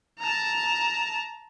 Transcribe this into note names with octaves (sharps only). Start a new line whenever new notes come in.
A5 A#5